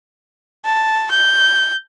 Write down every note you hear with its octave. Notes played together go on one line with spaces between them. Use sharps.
A5
G6